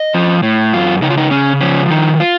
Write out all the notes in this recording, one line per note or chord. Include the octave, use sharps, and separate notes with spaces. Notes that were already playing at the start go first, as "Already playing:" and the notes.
Already playing: D#5
F3
A2
F#2 F4
C#3 D#4
F4
D#4
C#3 C#4
F3 C#4
D#3 D#4
F4